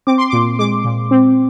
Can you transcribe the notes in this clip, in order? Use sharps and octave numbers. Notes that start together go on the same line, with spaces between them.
C4 D6
C6
A#2 D6
G#3 D6
A#2
C4